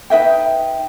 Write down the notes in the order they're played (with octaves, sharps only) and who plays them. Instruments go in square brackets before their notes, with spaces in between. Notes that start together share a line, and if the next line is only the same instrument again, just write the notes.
[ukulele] D#4 B4 E5 G5